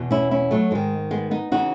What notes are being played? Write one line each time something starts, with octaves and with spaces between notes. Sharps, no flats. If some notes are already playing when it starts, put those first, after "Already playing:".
Already playing: E2 B2
C#4 E4
C#4 E4
F#3 A3
G#2 D#3 G#3
G#3 B3
B3 D#4
C#3 E3 D#4 F#4